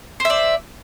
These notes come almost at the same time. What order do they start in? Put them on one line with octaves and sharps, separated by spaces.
C5 E5 D5